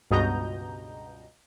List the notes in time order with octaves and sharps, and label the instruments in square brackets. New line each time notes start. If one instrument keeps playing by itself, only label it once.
[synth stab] C#2 G2 B2 D#5 A#5 G6